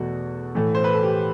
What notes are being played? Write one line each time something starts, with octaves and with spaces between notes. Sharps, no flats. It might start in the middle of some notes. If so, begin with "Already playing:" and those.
Already playing: E2 B2 A3 F#4
A2 E3 A3
C5
B4
A4
G4